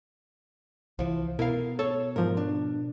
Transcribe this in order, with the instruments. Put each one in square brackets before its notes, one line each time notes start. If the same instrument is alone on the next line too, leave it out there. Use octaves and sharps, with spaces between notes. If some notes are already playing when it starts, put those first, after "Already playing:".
[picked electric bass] C2 E3 [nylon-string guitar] F3
[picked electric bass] B2 [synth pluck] E4 F5 [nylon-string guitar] A#4
[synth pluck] A4 [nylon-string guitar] C#5
[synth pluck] G#2 F3 [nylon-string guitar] A#4
[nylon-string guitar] D4